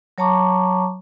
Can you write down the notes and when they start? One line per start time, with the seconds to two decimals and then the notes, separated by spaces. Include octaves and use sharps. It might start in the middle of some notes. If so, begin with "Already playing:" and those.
0.18 F#3 C#5 A5 A#5 C#6 D6